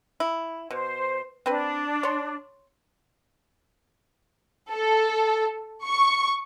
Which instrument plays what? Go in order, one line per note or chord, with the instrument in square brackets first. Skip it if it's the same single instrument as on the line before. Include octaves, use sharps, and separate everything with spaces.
[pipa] E4
[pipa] B2 [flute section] C5
[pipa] C4 B4 [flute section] D4
[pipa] C#5 C6
[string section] A4
C#6